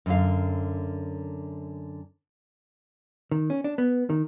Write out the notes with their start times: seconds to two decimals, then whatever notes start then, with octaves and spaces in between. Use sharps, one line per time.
0.06 F#2 D3 F5
3.32 D#3
3.50 C#4
3.64 D4
3.78 B3
4.10 D#3